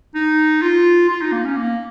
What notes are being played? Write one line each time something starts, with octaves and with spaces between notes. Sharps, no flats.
D#4
F4
F4
D#4
A#3
C#4
A#3